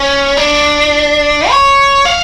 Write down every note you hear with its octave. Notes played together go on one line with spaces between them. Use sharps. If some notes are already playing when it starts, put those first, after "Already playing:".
Already playing: C#4
D4
C#5
F5